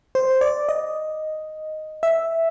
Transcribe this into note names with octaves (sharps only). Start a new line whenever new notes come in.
C5
D5
D#5
E5